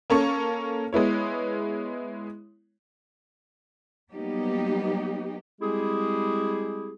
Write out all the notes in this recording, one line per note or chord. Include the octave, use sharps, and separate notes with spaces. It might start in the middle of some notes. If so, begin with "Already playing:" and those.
A#3 C#4 A4 C#6
G#3 B3 E4 C#5
F#3 G3 A#3 B3 D#4 G4
G3 G#3 C4 E4 G4 G#4